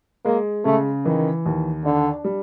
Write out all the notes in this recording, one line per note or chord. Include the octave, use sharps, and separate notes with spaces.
G#3 A#3
C#3 A3
D#3 E3
D#2
D3 D4
G3